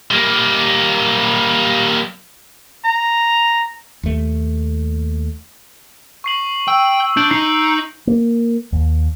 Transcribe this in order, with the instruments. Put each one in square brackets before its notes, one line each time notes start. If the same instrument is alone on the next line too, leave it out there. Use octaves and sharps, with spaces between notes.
[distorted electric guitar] G3 A#3
[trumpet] A#5
[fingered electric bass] D#2 A3
[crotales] C#6 C7 F#7
[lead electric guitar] G5 [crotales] E6
[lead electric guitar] D4 [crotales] G6 D7 F#7
[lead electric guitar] D#4 [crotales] C7
[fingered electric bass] A#3
D#2